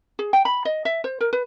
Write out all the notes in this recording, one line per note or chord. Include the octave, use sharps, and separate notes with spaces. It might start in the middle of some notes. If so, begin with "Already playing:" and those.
G#4
G5
B5
D#5
E5
C5
A#4
B4